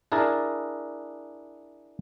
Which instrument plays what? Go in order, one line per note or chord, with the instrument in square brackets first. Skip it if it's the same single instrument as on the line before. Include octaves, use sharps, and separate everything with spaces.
[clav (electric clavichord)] D4 E4 G#4 A#4 A5